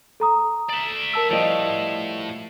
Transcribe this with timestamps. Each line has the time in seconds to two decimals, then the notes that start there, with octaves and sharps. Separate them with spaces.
0.20 A4 A#5 D#6
0.70 D5 E5
1.14 A#4 A5 E6
1.30 A2 F3 G3 D#5